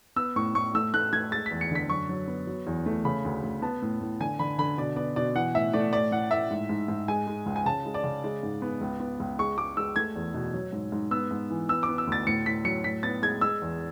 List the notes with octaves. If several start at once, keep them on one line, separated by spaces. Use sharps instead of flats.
B3 E6
A2 C#6
A2 C#6
A3 E6
A3 F#6
A3 G#6
G#3 A6
B6
E2
C#7
D3 B6
F#2 C#6
F#3
B3
F#3
E2
A3
C#3 B5
D2
D2
B3 A5
A2
A2
D3 G#5
D3 B5
D3 B5
B2 D5
B3 D5
B2 D5
E3 F#5
A2 E5
A3 D5
A2 D5
A2 F#5
A2 E5
G#2
G#2
G#2
G#3 G#5
G#3
C#2
G#5
C#3 A5
G#3
D5
C#3
G#3
G#2
B3
C#2
B3
C#2
G#3 C#6
G#3 D6
G#3 E6
A3 G#6
E2
B2
F#3
G#2
G#2
B3 E6
G#2
E3
B3 E6
D6
B3
E6
D2 A6
A2 C#7
A2 B6
F#3 C#7
A2 B6
B3 A6
G#3 G#6
G#3 E6
E2